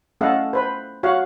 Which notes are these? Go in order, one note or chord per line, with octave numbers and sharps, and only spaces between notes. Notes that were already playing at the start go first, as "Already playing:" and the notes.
A3 C#4 A4 D#5 F5 F#5
B4 C5 B5
F#4 C#5 F5 F#5